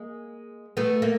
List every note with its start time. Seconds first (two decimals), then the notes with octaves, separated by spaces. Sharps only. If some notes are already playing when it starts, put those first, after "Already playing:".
Already playing: G#3 A#3
0.77 A3 B3
1.02 A#3